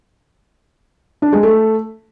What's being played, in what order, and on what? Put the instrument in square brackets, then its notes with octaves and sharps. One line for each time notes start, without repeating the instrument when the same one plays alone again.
[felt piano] D4
G#3
A3